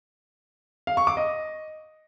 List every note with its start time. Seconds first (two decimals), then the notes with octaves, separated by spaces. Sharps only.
0.87 F5
0.97 C#6
1.07 D6
1.17 D#5